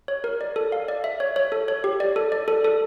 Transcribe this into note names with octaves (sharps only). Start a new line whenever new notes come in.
C#5
A#4
D5
A4
F5
D5
E5
C#5
C#5
A4
C#5
G4
D5
A4
D5
A4
A4